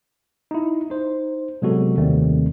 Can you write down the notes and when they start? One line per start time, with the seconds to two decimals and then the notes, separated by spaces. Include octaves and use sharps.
0.51 D#4 E4
0.90 D#4 C5
1.62 C3 F#3 G#3 B3 F#4 A4
1.98 D#2 C3 D#3 G3 A3 C4